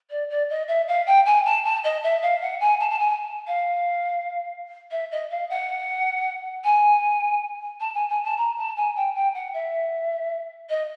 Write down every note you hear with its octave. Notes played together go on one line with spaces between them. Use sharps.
D5
D5
D#5
E5
F5
G5
G#5
A5
A5
D#5
E5
F5
F#5
G#5
A5
A5
G#5
F5
E5
D#5
F5
F#5
G#5
A5
G#5
G#5
A5
A#5
A5
G#5
G5
G5
F#5
E5
D#5